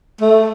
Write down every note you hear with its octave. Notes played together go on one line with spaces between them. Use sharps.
A3